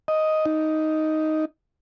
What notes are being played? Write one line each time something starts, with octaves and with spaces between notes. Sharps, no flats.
D#5
D#4